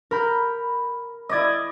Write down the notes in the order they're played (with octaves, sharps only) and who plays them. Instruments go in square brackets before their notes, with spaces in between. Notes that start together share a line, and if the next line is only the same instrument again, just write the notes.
[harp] A#4 B5 G6
[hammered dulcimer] E4 D5 D#5 [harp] D#6 G#6